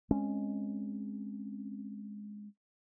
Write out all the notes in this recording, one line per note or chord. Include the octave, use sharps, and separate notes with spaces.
G#3 C4 C#4